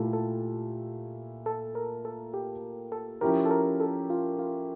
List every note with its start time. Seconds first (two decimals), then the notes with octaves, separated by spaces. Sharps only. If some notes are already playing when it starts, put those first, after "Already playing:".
Already playing: A#2 A3 E4 G4 A4
0.13 A4
1.46 A4
1.75 A#4
2.05 A4
2.34 G4
2.92 A4
3.21 F3 C#4 E4 G4 A#4
3.46 A4
3.51 A#4
3.80 A4
4.10 F4
4.39 F4